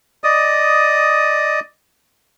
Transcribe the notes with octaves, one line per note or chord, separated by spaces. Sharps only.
D5 D#5 D#6